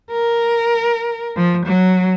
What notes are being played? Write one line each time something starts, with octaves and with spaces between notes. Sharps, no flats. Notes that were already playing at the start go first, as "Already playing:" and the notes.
A#4
F3
F#3